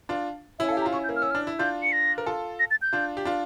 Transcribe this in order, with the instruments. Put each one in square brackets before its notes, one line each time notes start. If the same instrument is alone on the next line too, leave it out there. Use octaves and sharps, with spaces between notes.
[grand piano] D4 F4
[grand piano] C#4 E4 [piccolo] E5
[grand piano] A4 [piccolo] F5
[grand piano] G4
[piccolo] A#5
[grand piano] F4
[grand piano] C#4 E4 [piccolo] C#6
[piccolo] G6
[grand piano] A#3
[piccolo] F6
[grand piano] C#4 [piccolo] E6
[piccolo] F6
[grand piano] D4
E4
[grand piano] D4 F4 [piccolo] G6
[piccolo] C#7
A#6
[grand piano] A#4
F4 A4
[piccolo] A#6
A6
G6
[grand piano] D4 F4
G4
D4 F4